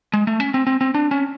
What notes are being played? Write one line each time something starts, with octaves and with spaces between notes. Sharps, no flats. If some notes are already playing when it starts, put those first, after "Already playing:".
G#3
A3
C#4
C4
C4
C4
D4
C#4